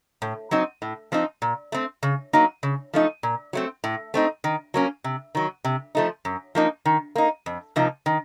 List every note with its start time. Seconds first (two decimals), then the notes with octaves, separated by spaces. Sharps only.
0.22 A2
0.51 F#3 C4 D#4
0.82 A2
1.12 F3 C4 D#4
1.42 A#2
1.72 A3 C4
2.03 C#3
2.33 F#3 A#3 D#4
2.63 C#3
2.93 F3 A3 D#4
3.23 A#2
3.53 F#3 A3 C4
3.84 A2
4.14 A3 C4 D#4
4.44 D#3
4.74 F#3 A#3 C#4
5.04 C3
5.35 D#3 F#3
5.64 C3
5.95 F3 A3 D#4
6.25 F#2
6.55 F3 A#3 D#4
6.85 D#3
7.15 A#3 D#4
7.46 F2
7.76 C3 F3 A#3 D#4
8.06 D#3